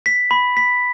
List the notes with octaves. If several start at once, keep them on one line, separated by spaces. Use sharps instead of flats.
B6
B5
B6